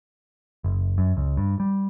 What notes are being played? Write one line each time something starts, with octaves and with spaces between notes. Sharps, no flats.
F#1
F#2
C#2
G2
G3